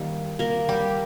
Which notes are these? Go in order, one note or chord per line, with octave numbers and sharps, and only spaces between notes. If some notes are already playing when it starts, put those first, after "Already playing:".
Already playing: D#3 G3 A#3
A#3 A#4
G3 G4